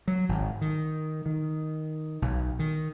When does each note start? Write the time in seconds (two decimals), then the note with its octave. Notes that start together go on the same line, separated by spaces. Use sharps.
0.08 F#3
0.29 G#1
0.61 D#3
1.26 D#3
2.22 B1
2.59 D#3